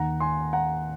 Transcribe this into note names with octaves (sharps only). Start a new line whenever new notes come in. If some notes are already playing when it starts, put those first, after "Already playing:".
Already playing: D#2 D#3 F#5 A#5
G#5 C6
F#5 A#5